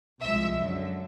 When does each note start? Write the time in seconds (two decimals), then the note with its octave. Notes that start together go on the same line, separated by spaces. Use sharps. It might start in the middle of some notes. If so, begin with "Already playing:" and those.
0.20 C2 C3 F3 G#3 E5
0.56 F#2 D3 F#3